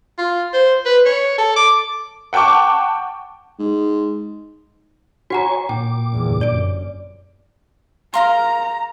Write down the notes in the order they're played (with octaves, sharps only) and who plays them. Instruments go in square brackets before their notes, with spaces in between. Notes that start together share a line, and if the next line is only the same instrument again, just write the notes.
[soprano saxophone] F4
C5
B4
C#5
A4
D6
[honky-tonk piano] F#5 G5 A5 C#6 D6
[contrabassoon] G#2
[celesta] F#4 F#5 A#5 [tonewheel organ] C#5 G#5 C#6
[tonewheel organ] A#2 D6 [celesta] G5
[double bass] G1 E2
[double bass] F#2 [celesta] D5 D7
[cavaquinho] A#4 F5 C6 [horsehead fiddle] A#5